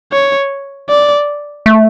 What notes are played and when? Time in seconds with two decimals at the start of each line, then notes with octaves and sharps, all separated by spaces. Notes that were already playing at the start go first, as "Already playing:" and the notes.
0.12 C#5
0.89 D5
1.66 A3